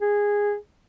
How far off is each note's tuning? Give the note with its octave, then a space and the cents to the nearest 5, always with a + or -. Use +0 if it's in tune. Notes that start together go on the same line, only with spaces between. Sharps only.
G#4 -10